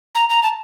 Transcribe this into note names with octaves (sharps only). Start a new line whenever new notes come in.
A#5
A#5
A5